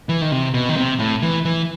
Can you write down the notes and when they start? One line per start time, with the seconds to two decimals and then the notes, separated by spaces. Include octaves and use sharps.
0.09 E3
0.22 D#3
0.32 C3
0.54 B2
0.69 D#3
0.77 C3
0.99 A2
1.22 E3
1.45 E3